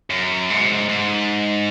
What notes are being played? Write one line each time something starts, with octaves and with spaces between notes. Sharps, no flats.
F#2
G#2
G#2